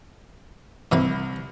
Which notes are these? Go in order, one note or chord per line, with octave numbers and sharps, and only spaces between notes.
C2 E3 D#4 B4